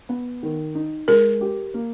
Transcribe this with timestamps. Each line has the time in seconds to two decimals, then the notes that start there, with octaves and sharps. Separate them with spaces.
0.09 B3
0.43 D#3
0.75 D#4
1.08 G#3 A#4
1.41 G4
1.74 A#3